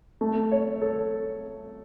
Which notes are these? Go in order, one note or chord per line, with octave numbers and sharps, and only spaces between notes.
A3
C#5
A4